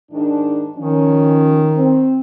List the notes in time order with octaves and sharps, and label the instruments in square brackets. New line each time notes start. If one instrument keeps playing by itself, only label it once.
[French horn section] G#2 D#3 D4
[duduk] D#3 [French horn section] F3 C#4
[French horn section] C4